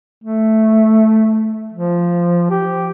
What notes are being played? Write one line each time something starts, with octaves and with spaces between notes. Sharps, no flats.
A3
F3
G4